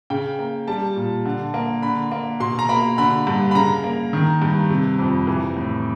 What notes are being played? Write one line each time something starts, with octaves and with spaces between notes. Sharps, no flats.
C#3 G5
A#3
G3 A5
A#2
D3
A#3
D3 B5
A#3
B2 C6
A#5
A#3 B5
D3 B5
G2
B5
C#3 A#5
A#3
D#3
G2
C3
F2
E3
A2